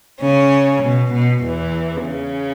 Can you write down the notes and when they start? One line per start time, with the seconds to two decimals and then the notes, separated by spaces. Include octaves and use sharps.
0.22 C#3 C#4
0.83 B2
1.13 B2
1.43 E2 E3
2.04 C#3